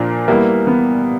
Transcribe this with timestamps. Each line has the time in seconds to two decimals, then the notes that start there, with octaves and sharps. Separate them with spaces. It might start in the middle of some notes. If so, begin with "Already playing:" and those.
Already playing: A#2 F3 A#3 D4
0.28 G3 A#3 B3 E4
0.67 B3